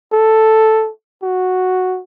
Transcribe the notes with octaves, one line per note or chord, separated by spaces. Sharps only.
A4
F#4